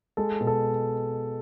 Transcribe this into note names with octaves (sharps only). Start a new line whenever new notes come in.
G#3 A4
B2
A4